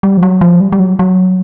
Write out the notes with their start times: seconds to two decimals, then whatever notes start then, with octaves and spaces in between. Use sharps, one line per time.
0.03 G3
0.17 F3
0.23 F#3
0.41 F3
0.61 G3
0.72 G3
0.80 F#3
0.99 F#3